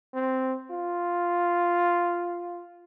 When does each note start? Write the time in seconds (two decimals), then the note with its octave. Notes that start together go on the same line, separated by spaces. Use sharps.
0.14 C4
0.71 F4